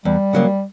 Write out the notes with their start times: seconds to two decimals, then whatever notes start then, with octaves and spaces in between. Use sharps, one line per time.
0.05 E2 G3
0.33 C#3 F#3 A#3